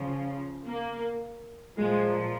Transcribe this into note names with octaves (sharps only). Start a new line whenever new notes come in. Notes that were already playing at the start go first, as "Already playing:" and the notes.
Already playing: C#3 F3
A#3
A#2 F3 G#3